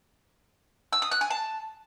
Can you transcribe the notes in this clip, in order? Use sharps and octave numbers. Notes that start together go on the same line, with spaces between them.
E6
D#6
F#6
G#5
A5